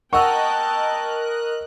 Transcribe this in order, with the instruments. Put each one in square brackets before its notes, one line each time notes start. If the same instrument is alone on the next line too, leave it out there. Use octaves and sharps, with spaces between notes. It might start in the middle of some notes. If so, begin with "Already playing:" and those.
[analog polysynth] A#4 D#5 F#6 [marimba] F#5 [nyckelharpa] G5 A5 [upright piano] C#6 E6